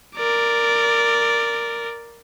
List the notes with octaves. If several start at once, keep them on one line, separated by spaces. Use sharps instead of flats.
A#4 D5